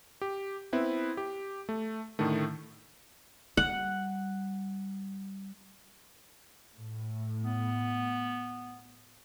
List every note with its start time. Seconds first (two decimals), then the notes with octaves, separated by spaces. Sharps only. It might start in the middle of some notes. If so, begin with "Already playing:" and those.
0.21 G4
0.73 B3 C4 E4 B4
1.17 G4
1.69 A3
2.19 A2 D3 D#3 A3
3.57 G3 F#5
6.76 A2
7.43 B3